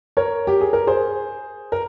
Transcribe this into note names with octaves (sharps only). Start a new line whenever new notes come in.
A#4 C#5
G4
G#4
A#4
G#4 C5
A#4